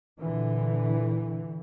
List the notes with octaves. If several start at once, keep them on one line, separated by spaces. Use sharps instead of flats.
A#2 D3 E3